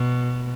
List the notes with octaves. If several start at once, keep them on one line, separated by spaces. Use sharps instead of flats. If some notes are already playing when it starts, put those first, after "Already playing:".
Already playing: B2